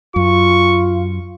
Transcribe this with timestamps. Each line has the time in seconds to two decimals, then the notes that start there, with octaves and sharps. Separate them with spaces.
0.16 F#2 F4 C#6